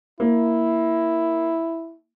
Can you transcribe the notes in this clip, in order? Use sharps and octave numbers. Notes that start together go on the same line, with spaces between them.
A#3 E4